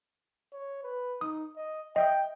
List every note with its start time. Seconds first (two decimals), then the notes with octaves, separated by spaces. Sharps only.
0.53 C#5
0.83 B4
1.21 D#4 D#6
1.56 D#5
1.96 D#5 E5 G5 D#6